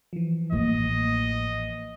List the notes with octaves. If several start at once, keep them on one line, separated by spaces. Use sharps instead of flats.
E3 F3
A1 A#3 D#5